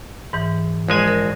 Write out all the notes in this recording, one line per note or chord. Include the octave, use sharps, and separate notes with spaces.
G#2 E3
A#1 G#3 G#5
A#4